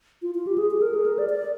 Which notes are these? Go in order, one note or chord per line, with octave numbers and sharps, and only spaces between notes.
F4
F4
G4
G#4
G#4
A#4
G#4
A#4
D5
D5